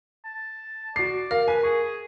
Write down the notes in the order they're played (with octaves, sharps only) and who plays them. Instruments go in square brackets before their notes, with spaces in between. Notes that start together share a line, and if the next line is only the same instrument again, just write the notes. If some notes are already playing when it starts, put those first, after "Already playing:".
[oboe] A5
[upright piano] F#4 C7 [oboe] D5
[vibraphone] A#4 [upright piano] F5
[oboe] B4 [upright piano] G#5
[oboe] G#4 [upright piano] C#6